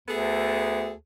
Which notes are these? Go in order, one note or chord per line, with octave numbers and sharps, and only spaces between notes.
D2 B3 G#4 A4